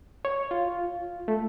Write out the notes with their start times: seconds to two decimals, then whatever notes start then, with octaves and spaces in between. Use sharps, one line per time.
0.25 C#5
0.51 F4
1.28 A3